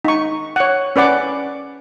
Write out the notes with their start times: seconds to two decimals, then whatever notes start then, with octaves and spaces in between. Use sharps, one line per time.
0.05 D#4 C#6
0.56 C#5 F#5
0.96 C#4 B4 D5 F#5 D6